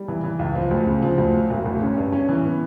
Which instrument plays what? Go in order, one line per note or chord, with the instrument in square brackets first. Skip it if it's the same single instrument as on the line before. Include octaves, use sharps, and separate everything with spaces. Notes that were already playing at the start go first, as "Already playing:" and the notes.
Already playing: [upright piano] G3
E3
E3
C#2
F3
D2
C#3
F3
D2
F#3
E1
D2
C#4
G2
C#4
E3
B3